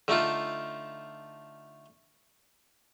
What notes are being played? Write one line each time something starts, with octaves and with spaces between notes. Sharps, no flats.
D3 A3 D#4 F4